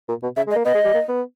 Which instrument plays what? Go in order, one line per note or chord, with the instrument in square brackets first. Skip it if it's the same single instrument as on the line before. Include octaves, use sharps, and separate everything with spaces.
[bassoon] A#2
B2
[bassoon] C#3 [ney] E5
[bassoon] G#3
[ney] D#5
[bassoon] A#3
[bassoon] B3 [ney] D#5
[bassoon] G#3
G3
A#3
B3